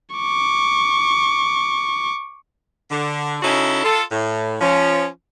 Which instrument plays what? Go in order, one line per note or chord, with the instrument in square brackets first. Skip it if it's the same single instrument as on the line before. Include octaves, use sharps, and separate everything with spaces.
[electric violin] C#6 D6
[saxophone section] D3
C#3 C#4 D#4 E4 F#4 A4
F4 A4
A2
F3 C#4